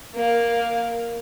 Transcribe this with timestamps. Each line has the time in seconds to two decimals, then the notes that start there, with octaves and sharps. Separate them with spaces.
0.15 A#3 F5